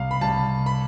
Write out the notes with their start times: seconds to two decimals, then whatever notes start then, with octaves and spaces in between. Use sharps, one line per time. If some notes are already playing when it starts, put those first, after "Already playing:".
Already playing: C2 F5
0.11 B5
0.21 C2 A5
0.66 B5